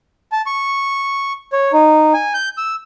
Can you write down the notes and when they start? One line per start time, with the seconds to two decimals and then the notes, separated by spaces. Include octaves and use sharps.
0.32 A5
0.46 C#6
1.53 C#5
1.73 D#4
2.14 G#5
2.34 G6
2.58 E6